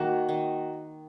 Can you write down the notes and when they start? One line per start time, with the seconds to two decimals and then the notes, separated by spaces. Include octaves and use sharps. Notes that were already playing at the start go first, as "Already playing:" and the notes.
Already playing: D#3 A#3 F#4
0.29 D#3